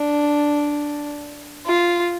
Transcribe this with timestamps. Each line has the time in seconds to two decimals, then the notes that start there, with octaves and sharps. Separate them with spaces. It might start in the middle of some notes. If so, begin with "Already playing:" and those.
Already playing: D4
1.66 F4